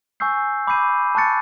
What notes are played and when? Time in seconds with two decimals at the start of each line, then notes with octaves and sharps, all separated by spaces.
0.20 G#5 C#6 E6 G6 C7
0.67 B5 D6 G6 C7 D#7
1.15 A5 C#6 F#6 A6 C#7